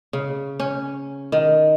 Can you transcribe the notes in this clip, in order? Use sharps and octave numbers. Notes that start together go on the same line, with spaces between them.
C#3
C#4
D#3